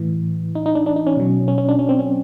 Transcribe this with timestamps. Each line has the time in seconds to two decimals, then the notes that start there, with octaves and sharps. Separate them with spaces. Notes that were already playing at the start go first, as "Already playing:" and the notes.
Already playing: A2 E3
0.55 D#4
0.66 D#4
0.75 D4
0.86 D4
0.96 D#4
1.07 C#4
1.17 B2 F#3
1.48 C#4
1.58 C#4
1.69 D4
1.79 C#4
1.89 C4
1.99 C#4